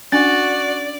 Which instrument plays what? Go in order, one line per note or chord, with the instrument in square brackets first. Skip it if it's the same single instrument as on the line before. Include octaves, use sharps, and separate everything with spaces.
[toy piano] C#4 D4 [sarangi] F#4 [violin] D5 [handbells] A6